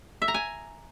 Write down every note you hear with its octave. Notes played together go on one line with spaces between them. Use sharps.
E5
A#5
G#5